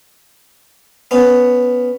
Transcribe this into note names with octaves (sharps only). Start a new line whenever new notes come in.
B3 C#4